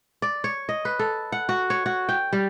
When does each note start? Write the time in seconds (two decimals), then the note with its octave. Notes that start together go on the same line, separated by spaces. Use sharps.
0.22 D5
0.44 C#5
0.69 D#5
0.85 B4
0.99 A4
1.32 F#5
1.49 F#4
1.70 C#5
1.86 F#4
2.09 G5
2.33 G3